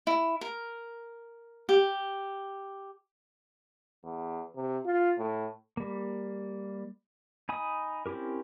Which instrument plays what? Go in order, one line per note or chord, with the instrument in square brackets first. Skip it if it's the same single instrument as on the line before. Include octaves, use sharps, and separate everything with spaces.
[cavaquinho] E4
A#4
G4
[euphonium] E2
C3
F4
A2
[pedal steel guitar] G3 A#3
D#4 G#5 B5 D#6
C4 C#4 E4 G4 A#4